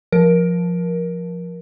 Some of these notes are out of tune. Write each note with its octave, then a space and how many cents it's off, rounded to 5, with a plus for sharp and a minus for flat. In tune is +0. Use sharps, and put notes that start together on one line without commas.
F3 +0 A#4 +20